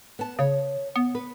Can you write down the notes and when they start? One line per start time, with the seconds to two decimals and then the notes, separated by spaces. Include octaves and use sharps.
0.19 B3 A5
0.39 C#3 C#5
0.96 B3
1.15 B4